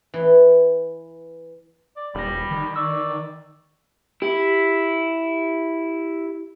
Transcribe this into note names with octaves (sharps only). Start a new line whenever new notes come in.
E3
D5
D#1 G3 B5 A#6
D#3
D5 C#6 E6
E4 G4